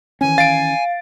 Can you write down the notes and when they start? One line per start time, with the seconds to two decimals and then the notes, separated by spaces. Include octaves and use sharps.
0.21 D#3 E3 C#4 G#5
0.38 F5 A6 D7